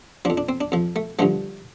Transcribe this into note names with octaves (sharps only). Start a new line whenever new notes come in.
F2 F3 D4
D4
C4
D4
F2 F3
A3
G2 D3 F3 A3